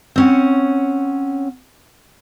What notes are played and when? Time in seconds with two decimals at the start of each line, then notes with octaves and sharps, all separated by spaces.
0.16 C4 C#4 F#5